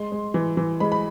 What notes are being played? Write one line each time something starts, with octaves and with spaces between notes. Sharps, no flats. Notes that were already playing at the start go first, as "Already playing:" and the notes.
Already playing: G#3 C6
G#3
E3
E3
G#3 B5
B5